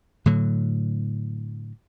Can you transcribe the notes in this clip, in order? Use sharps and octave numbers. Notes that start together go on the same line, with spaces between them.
A2 D3 F#3